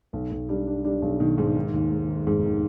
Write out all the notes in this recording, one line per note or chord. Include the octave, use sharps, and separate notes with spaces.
B1
B1
G3 D4
D4
G3 D4
B1
B2 D#3
G#2 G#3
D#3
D#2
G#3
D#3
F1 G#2
D#3